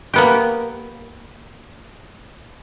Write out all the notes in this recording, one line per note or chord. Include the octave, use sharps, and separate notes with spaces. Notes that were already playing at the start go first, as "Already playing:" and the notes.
A#3 B3 G4